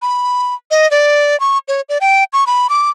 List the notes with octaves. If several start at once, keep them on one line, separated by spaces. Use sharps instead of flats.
B5
D#5
D5
C#6
C#5
D5
G5
C#6
B5
D6